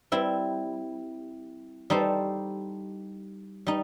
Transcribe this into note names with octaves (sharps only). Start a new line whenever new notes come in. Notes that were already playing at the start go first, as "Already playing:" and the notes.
G3 C4 E4
G3 D#4 A4 C5
G3 D#4